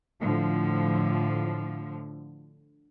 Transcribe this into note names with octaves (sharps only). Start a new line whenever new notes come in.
A2 D3 F3